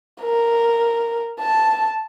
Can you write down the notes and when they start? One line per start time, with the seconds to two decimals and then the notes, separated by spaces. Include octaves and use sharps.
0.22 A#4
1.40 A5